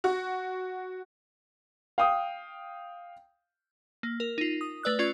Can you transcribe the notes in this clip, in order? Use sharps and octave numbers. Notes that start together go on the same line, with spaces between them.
F#4
F5 G5 D#6
A#3
A#4
D#4 F4
D#6
A3 B4 D5 E6 F#6
C#4 F4 D5 C#6 G#6